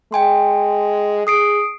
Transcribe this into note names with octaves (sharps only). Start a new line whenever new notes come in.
G#3 G5 G#5 C6
G#4 D#6 C7 D7